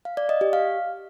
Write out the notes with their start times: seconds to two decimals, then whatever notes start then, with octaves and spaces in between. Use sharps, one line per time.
0.05 F5
0.17 D5
0.29 D#5
0.41 G4
0.53 F5